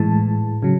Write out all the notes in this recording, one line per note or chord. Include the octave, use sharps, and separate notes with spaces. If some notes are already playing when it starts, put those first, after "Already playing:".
Already playing: A2 E3 G#3 A5
C#3 F#3